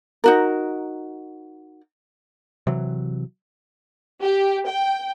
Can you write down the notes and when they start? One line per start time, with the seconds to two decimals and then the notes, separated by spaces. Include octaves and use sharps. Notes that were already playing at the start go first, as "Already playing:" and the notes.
0.24 D#4 F#4 A#4
2.67 C3 E3 F#3
4.23 G4
4.67 G5